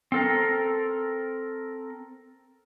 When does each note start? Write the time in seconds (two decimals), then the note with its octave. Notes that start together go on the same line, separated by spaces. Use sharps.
0.12 C4 A4 A#4